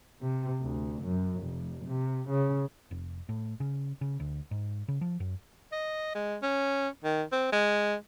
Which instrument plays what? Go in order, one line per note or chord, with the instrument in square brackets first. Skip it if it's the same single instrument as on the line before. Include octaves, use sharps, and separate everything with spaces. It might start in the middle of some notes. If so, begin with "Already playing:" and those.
[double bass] C3
D2
F#2
F1
C3
C#3
[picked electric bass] F1
A2
C#3
C#3
D2
G#2
C#3
F3
F#2
[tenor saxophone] D#5
G#3
C#4
D#3
C4
G#3